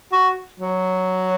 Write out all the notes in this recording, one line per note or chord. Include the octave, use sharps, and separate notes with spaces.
F#4
F#3